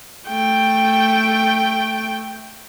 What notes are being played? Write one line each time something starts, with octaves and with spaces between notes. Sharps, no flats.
A3 G5